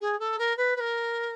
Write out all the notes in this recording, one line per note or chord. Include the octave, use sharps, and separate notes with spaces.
G#4
A4
A#4
B4
B4
A#4